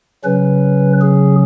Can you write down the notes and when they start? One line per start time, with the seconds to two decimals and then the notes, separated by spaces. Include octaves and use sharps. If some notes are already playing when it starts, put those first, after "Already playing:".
0.24 C#3 F#3 C#4 B4
1.01 G#4